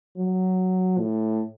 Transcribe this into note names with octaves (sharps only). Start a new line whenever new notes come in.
F#3
A2